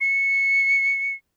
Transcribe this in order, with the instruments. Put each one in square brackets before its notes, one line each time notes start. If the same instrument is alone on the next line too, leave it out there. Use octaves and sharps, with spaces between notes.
[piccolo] C#7